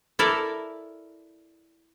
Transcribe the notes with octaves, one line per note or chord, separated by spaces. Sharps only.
E4 A4 A#4 D5 E5